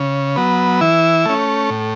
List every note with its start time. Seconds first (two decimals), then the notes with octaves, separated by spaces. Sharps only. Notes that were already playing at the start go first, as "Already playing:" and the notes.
Already playing: C#3
0.36 F#3 B3
0.81 E3 E4
1.25 A3 C#4
1.70 A2